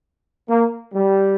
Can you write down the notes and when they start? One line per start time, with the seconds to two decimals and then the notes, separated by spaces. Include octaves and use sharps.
0.49 A#3
0.94 G3